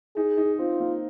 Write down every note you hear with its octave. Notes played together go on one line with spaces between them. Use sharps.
D#4 G#4
D#4
C4 F4
A#3